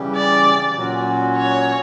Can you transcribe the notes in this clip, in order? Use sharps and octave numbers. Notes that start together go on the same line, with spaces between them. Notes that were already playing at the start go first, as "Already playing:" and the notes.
Already playing: C#3 E3 G3 C#4 G4
D5
A#2 F#3 C#4 F#4
C#5